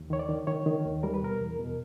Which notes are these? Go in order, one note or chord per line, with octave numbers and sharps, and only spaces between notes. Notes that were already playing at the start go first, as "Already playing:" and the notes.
Already playing: D#2
D#3 C#5
D5
D#3
D#3 C#5
D#3
D#2
G3 A#4
B4
B2 A#4
E2
B2